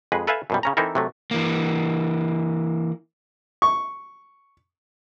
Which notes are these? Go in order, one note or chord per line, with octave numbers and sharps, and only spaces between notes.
F2 G#3 G#4 B4
A4 B4 E5 F5 G#5 A5
F#2 B2 G3
C#3 C#4 A#5
E3 C4 D#4 E4 A4 A#4
C3 F#3 A3
E3 A#3
C#6